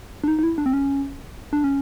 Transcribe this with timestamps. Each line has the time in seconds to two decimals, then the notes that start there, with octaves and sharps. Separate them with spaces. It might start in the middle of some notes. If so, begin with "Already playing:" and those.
0.24 D4
0.28 D#4
0.39 D#4
0.43 E4
0.58 D4
0.66 C4
0.73 C#4
1.53 D4
1.64 C#4